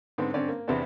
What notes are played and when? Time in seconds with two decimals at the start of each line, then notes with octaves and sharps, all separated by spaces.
0.18 G#2 D3 B3 C4
0.34 G2 D3 C4 C#4 D5
0.48 A#3
0.68 E2 C3 B3 C4 D4